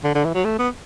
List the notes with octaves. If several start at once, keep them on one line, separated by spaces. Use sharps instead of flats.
D3
D3
E3
F#3
A3
B3